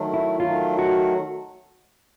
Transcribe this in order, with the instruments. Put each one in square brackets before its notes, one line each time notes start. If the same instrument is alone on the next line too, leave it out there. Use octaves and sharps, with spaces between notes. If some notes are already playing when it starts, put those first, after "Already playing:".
Already playing: [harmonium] D#3 F#3 A3
[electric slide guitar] E4
[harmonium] D#3 F#3 A3 [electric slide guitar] F4
[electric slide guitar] F#4